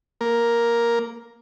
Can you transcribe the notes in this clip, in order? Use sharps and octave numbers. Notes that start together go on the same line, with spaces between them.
A#3 A#4